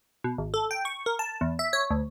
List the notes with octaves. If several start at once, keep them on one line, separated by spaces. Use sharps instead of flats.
B2
G#1
A4
G5
C#6
A#4
A5
E2
E5
C#5
D2